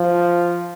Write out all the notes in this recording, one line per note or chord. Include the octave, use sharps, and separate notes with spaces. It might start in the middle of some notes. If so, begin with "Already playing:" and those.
Already playing: F3